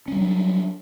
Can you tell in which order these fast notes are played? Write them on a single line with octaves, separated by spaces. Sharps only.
C#4 G3 F#3 D4